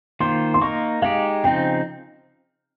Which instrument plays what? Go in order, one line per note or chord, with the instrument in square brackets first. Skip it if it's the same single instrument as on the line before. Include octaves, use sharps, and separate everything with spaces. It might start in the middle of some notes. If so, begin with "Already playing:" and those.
[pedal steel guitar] D#3 A#3 F4 C5 [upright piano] C6
[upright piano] C6
[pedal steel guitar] A#3 D#4 A#4 [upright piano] C#6
[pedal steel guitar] G#3 D#4 G4 [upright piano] F5
[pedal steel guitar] C#3 F3 C4 D#4 [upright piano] G5